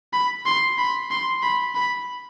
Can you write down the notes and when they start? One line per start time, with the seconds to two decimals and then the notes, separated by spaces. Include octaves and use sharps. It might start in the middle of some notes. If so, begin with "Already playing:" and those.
0.13 B5
0.46 C6
0.78 B5
1.11 C6
1.43 B5
1.75 B5